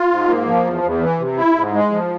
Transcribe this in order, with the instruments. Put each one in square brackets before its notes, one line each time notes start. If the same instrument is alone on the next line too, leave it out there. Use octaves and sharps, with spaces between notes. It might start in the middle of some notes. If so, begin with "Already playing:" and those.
Already playing: [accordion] F4
G#2
A#3
F3
E2
E2
E3
C3
E4
G#2
G#3
F3